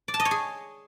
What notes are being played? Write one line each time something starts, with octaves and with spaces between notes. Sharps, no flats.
D5
A5
D#5
C#5
G#4